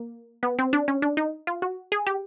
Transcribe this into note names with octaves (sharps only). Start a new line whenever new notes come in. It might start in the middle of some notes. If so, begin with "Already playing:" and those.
Already playing: A#3
B3
C4
D4
C#4
D4
D#4
F4
F#4
G#4
G4